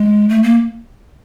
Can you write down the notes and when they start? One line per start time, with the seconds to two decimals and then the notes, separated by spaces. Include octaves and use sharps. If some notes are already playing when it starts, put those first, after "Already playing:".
Already playing: G#3
0.29 A3
0.43 A#3